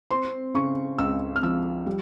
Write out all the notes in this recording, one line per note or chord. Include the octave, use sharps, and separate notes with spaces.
C4 C6
C#3 C#6
C#2 E6
F6
F3 E6
G3